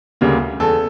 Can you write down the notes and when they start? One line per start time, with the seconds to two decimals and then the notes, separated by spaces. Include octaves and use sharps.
0.21 D2 C#3 G3 A#3
0.60 E2 A4